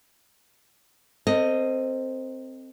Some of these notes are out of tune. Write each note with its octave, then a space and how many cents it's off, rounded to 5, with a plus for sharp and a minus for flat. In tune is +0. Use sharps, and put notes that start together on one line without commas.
C4 +0 A4 +40 D#5 +0